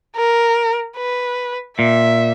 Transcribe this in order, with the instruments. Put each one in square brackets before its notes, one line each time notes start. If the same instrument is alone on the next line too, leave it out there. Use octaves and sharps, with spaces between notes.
[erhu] A#4
B4
[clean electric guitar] A#2 [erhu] E5